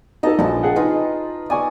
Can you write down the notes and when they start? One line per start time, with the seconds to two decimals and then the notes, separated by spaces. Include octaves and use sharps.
0.23 A#3 D#4 A4 D#5 A5
0.39 A#1 F3 A5
0.63 G#4 F#5 G5
0.76 D#4 F4 B4 G#5
1.50 D5 G#5 C#6 D#6